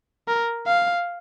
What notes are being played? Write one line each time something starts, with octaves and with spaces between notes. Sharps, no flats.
A#4
F5